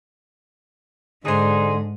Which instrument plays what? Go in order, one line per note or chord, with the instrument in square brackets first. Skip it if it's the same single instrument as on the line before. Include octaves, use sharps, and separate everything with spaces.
[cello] G#2 [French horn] D3 [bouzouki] D4 C5 [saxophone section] D#4 G#4